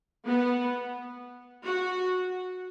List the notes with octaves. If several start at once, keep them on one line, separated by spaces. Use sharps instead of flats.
B3
F#4